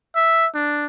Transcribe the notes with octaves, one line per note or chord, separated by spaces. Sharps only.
E5
D4